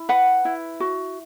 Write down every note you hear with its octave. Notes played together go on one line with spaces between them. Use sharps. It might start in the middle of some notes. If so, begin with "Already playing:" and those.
Already playing: E4
B4 F#5
E4
F#4